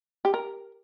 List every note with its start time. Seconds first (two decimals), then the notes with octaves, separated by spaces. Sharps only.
0.25 G4
0.34 A#4